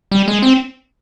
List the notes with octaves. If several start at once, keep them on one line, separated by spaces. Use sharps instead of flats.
G3
G#3
C4